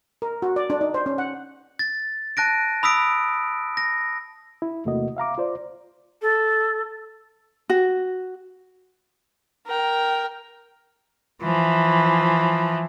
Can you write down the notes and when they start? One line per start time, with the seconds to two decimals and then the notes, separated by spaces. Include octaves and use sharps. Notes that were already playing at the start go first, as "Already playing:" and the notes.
0.22 A#4
0.42 F#4
0.56 D5
0.70 D4
0.81 D#4
0.94 C5
1.06 C#4
1.18 F#5
1.79 A6
2.37 A5 F#6 A#6 D7
2.83 B5 D#6 E6 B6 D7
3.77 A#6
4.62 E4
4.85 E2 C3 A3 A#3 F#4 D#5
5.17 E5 F5 A#5 D6
5.38 F4 C5 D5
6.22 A4
7.70 F#4
9.67 A#4 G5
11.43 E3 F3